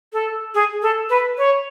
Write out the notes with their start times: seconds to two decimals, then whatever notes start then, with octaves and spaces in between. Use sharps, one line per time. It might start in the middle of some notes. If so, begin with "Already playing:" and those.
0.13 A4
0.54 G#4
0.82 A4
1.10 B4
1.38 C#5